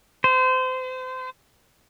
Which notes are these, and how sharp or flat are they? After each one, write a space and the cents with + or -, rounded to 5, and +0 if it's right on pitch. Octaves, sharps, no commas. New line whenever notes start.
C5 -30